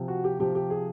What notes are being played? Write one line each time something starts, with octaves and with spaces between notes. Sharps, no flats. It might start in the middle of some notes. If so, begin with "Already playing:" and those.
Already playing: C3 F3
F#4
G4
C3 F3 G4
G4
G#4